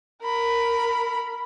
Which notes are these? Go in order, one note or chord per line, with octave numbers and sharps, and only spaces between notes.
A#4 B5